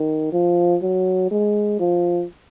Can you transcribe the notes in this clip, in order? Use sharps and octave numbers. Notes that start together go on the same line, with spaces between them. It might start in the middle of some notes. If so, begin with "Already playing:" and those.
Already playing: D#3
F3
F#3
G#3
F3